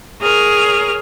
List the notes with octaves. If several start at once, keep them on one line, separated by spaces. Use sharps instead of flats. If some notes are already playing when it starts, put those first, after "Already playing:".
G#4 A#4 C#5 F6